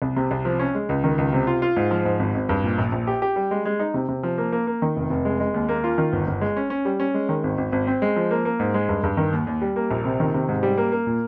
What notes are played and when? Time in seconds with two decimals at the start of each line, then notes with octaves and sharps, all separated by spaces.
0.02 C2
0.16 C3
0.31 C2
0.45 F3
0.59 C#4
0.75 G#3
0.89 C#2
1.04 D#3
1.18 C#2
1.33 C3
1.47 F4
1.62 F4
1.76 G#2
1.91 F3
2.05 G#2
2.19 G#1
2.34 G#1
2.49 G2
2.64 A#2
2.78 A#1
2.92 A#1
3.07 G4
3.22 G4
3.36 G3
3.51 G#3
3.65 G#3
3.80 D#4
3.94 C3
4.09 C3
4.23 F3
4.38 A#3
4.52 A#3
4.67 A#3
4.82 D#3
4.96 F1
5.10 F1
5.25 G#3
5.40 G#3
5.54 D#2
5.69 A#3
5.84 F4
5.98 D#3
6.13 G1
6.27 G1
6.41 G#3
6.56 C#4
6.70 C#4
6.85 G3
7.00 C#4
7.14 G#3
7.29 D#3
7.44 G#1
7.58 G#1
7.72 G#1
7.87 C4
8.02 G#3
8.16 F3
8.31 A#3
8.45 A#3
8.59 G#2
8.74 G#3
8.89 G2
9.03 G2
9.17 D#3
9.32 D#2
9.47 D#2
9.62 G3
9.76 A#3
9.91 A#1
10.05 C3
10.20 D#3
10.34 C3
10.49 G#2
10.63 G3
10.77 A#3
10.92 A#3
11.07 A#2